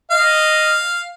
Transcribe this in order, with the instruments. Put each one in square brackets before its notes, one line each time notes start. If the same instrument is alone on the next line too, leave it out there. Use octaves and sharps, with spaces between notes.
[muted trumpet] D#5 [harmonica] F5